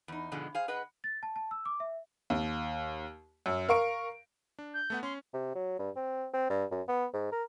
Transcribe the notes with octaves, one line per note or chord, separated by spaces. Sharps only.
E2 D#4
G#2 B2 D3 F3 G#3
G#4 C5 F5
G#4 B4 D#5 F#5
A6
A5
A5
E6
D6
E5
D#2
F#2
A#4 F5 C#6 D7
D4
G6
A3 B3 F#5
C#4 C6
C3
F#3
G2
C4
C4
G2
F#2
B3
G#2
A#4